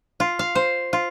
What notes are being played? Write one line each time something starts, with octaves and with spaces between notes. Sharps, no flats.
F4
F5
C5
F4